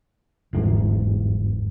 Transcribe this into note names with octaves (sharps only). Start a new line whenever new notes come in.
G1 E2 G#2